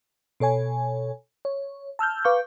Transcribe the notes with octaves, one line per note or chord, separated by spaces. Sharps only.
B2 A4 C#5 G#5
C#5
A5 E6 F6 G6
B4 F5 C#6 D6 G6